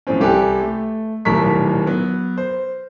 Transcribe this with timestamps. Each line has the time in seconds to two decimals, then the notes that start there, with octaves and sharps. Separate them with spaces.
0.07 A2 E3 F3 C4 C#4
0.20 C2 G4 A4 B4 G#5
0.61 A3
1.25 D#1 B1 A2 A#4 C#6 B6
1.86 F#3 B3
2.38 C5